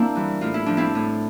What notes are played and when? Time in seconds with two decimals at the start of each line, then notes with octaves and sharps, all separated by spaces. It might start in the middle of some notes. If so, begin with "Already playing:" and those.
Already playing: A#3 C4 D4 E4
0.16 E3 G3
0.41 A2 F4
0.54 E4
0.66 F3 D4
0.77 C4 E4
0.95 A2